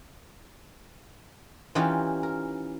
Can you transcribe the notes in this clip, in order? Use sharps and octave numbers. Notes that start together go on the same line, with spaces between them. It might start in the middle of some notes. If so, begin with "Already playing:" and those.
E3 C#4 D#4 F4 G4 A#4
A#4